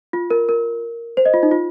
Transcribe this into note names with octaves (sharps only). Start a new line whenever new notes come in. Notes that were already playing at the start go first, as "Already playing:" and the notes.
F4
A#4
A#4
C5
D#5
F4
D#4
F4